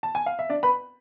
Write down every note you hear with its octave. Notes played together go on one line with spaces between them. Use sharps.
A5
G#5
F5
E5
D4 D5
B4 B5